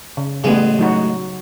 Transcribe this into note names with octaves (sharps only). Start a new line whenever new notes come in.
C#3
A1 C#3 G3 G#3 B3
F#3 D#4 F#4